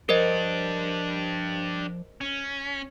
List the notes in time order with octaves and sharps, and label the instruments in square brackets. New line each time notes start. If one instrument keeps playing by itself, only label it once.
[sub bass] F3 [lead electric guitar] D4 G4 [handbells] A#4 C5 D#5
[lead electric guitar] C#4